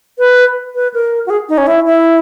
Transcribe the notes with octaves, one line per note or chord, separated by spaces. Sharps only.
B4
B4
A#4
F#4
G#4
D#4
C#4
E4
E4